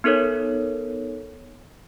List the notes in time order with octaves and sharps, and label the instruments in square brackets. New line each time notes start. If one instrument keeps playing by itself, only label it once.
[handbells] B3 D#4 A4 A#4 C#5